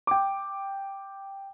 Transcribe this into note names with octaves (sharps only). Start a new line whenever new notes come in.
G5 D6